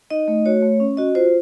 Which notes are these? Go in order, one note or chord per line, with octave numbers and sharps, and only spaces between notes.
D#4 D#5
A3
F#4 C#5
A3
C#4
F#4 D#5
F4 C5